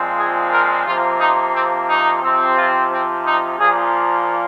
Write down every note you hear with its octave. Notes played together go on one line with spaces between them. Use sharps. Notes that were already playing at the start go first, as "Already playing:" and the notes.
Already playing: A#2 F3 G#3 C4
G#4
A#4
C3 F3 A#3 F4
D#4
C4
D#4
C3 F3 C4
F4
C4
D#4
A#2 F3 A#3 G#4